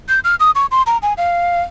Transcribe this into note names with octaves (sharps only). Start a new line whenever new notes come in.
G6
F6
D#6
C#6
C6
A#5
G#5
F5